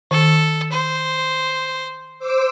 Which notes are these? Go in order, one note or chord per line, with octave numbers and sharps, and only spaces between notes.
D#3 A4
C5
C5 D6 E6